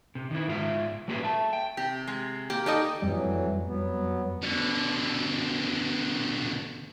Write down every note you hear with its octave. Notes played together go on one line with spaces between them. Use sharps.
C3
D#3 E4
G#2 F4 E5
G3 A#3 F#4 G#4 B4
E5 A5
G5
C3 G4
G#3
A#3 G4
D#4 G4 A4 D5 D#5 G#5
F2 A2 E3 F#3 G3
F#3 B3
B2 D3